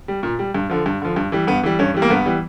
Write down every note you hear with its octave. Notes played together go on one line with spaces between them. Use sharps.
G3
A#2
G3
G2
D3 F3
G2
D3 F3
G2
E3 G3
G2 B3
E3 G3
G2 C#4
E3 G3
A#3
G2 B3
E3 G3